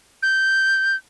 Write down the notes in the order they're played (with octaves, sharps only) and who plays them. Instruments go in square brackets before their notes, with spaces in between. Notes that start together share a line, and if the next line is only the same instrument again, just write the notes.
[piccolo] G6